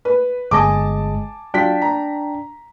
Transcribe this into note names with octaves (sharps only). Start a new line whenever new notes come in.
B4
G1 G#3 D#5 G#5 A5 D6
F#3 D4 F4 G5 B6
A#5